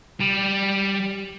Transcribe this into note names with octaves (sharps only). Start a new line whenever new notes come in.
G3